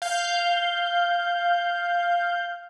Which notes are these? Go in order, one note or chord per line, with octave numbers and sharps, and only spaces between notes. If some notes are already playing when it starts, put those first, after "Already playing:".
F5 G6